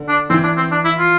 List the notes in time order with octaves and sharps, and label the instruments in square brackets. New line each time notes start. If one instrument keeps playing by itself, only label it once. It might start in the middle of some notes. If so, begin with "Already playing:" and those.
Already playing: [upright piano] D3
[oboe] D4
[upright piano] E3 [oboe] C4
[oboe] D4
C4
D4
E4
F4